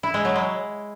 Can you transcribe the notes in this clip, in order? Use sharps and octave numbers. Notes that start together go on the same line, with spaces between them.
E4
G#3
F#3
G#3